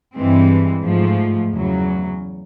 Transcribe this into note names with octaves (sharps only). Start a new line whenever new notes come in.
G2 E3 G#3 C4
G#2 F3 A3
E2 C#3 F#3